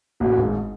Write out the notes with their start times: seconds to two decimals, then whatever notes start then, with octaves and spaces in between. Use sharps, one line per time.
0.20 A1 A2 F#4
0.37 G#1 G#2